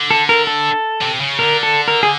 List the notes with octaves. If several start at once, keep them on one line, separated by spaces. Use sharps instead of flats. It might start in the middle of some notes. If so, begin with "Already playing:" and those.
Already playing: D3
A4
A#4
A4
C3
C#3
D3 A#4
A4
A#4
G#4